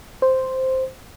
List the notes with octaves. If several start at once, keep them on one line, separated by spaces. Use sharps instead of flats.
C5